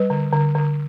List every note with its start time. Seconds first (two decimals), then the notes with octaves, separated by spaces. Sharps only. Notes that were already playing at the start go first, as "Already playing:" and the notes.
Already playing: G3 B4
0.10 D3
0.33 D3
0.55 D3